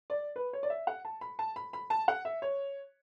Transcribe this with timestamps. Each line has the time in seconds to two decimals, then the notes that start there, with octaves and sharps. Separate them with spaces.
0.10 D5
0.36 B4
0.53 C#5
0.63 D5
0.70 E5
0.87 F#5
1.05 A5
1.21 B5
1.39 A5
1.56 B5
1.73 B5
1.90 A5
2.08 F#5
2.25 E5
2.42 C#5